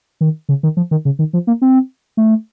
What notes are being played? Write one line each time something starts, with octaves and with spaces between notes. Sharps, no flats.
D#3
C#3
D#3
F3
D#3
C#3
D#3
F3
A#3
C4
A3